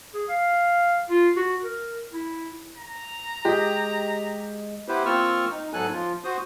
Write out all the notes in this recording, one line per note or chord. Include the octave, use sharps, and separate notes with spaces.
G#4
F5
F4
F#4
A#4
E4
A#5
G#3 G4 D#5
B3 E4 G4 B4 C5
A#3 C4 F4 C#6 E6 F6
D#4
G#2 F#3 B3 A4 G#5 F#6
F3 F4
F#4 C5 D#6